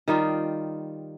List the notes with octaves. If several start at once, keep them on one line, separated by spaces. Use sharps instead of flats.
D#3 G3 D#4 F4